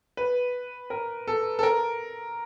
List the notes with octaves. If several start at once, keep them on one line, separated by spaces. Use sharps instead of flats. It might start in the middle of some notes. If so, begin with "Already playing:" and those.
B4
A#4
A4
A4
A#4